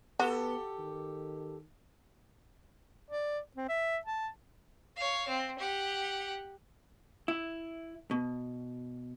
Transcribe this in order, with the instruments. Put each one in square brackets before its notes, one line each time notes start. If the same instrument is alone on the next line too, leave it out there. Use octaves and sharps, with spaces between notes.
[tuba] B3 [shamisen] F#4 [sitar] G4 A4
[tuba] D#3
[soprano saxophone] D5
C4
E5
A5
[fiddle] C#5 F5
C4
G4 F#5
[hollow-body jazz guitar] E4
B2